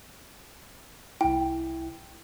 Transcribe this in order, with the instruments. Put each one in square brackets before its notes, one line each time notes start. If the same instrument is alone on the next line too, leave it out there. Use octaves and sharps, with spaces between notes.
[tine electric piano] C2 E4 [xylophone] G5